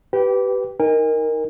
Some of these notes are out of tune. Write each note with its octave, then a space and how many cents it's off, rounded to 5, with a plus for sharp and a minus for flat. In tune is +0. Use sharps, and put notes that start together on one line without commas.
G4 -20 B4 +0 G5 +0
D#4 +0 A#4 +0 G#5 -40